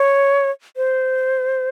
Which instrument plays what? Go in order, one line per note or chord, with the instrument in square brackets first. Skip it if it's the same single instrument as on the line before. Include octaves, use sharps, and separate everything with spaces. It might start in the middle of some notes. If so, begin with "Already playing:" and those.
Already playing: [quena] C#5
C5